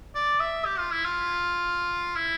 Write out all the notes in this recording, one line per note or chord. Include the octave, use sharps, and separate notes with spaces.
D5
E5
G4
F4
E4
F4
E4